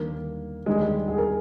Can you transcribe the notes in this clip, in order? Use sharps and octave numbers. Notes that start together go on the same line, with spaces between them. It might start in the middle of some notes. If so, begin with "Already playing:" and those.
Already playing: D#2 D3 G3 A#3
D#2 D3 G3 G#3
G#3
G#4
A#4